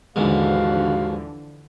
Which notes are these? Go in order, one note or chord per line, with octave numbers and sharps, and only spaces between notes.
D#2 G#2 D3 E3 F3 F#4 F5